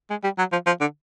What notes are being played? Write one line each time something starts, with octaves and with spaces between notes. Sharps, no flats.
G#3
G3
F#3
F3
F3
D3